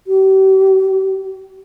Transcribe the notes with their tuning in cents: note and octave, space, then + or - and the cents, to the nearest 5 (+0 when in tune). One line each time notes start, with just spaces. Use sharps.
G4 -40